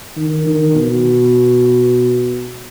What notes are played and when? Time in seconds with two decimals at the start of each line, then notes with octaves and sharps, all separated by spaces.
0.17 D#3
0.46 D#3
0.75 B2